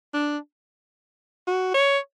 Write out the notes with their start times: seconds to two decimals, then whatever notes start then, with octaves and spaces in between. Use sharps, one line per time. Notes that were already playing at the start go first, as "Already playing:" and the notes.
0.14 D4
1.47 F#4
1.74 C#5